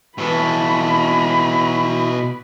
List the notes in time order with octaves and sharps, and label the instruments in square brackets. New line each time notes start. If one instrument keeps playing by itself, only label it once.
[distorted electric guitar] B2 A4 [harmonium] E3 [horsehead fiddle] B5